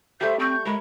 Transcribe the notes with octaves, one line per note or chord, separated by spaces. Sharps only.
G3 A3 A4 C5 E5 G6
C4 C#6 G6
G#3 A#4 C#5 B5